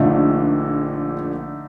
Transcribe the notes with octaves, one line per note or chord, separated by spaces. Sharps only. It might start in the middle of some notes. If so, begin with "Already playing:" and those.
Already playing: A#1 A#2 D3 A3 D#4